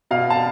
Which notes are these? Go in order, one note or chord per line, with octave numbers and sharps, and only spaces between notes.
B2 F5
A5